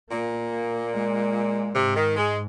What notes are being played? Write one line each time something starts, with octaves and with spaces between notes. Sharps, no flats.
A#2 A#3
G#3
G#2 C3
D#3
G#3